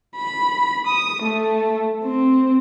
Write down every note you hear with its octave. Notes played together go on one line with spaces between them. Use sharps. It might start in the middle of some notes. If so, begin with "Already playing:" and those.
B5
D#6
A3
C4